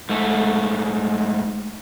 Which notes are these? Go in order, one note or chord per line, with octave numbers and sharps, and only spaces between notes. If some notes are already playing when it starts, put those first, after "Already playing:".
G#2 A3